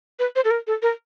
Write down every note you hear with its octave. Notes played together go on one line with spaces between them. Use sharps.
B4
C5
A4
A#4
A4
A#4